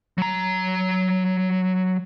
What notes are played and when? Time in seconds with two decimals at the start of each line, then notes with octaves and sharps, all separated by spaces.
0.18 F#3 A#5